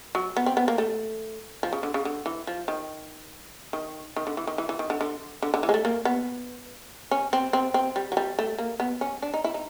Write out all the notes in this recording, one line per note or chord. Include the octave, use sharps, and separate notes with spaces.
F#3
B3
C4
B3
A#3
A3
F3
C#3
D3
C#3
D3
E3
F3
D#3
D#3
D#3
D3
E3
D#3
E3
E3
D#3
D3
D3
D3
D3
E3
G#3
A3
A#3
B3
C#4
C4
C4
C4
G3
F#3
G3
A3
A#3
B3
C#4
D4
D#4
E4
D#4